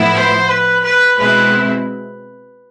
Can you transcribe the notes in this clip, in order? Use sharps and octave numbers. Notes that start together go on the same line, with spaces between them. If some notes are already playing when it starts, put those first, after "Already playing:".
Already playing: A2 F3 B3 E4
C5
B4
B4
B2 G#3 C4 E4 B4